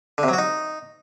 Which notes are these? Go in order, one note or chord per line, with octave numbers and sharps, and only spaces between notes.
D3
C3
F#3
F#4
D#4